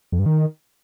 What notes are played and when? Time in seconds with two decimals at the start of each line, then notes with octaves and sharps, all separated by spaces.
0.12 F2
0.19 G2
0.26 D#3